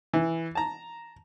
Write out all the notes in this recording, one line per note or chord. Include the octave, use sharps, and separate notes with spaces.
E3
A5 A#5